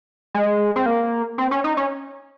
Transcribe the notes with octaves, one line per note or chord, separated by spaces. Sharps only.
G#3
C4
A#3
C4
C#4
D#4
C#4